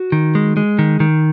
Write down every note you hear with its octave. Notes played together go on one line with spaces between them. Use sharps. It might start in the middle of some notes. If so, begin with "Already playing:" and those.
Already playing: F#4
D#3
G#3
G#3
D#3
D#3